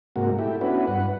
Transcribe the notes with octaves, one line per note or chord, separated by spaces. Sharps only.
G#2 C3 A#3 F#4
A3 E4 G4
B3 C#4 D4 E4 F#4 B4
G2 B4 F#5